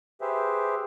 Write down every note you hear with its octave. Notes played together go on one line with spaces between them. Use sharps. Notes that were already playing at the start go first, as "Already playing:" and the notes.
G4 G#4 B4 C5 E5